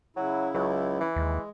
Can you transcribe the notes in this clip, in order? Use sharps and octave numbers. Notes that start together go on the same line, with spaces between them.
C#3 F#3 E4
C#2 F#3
E3
D#2 G#3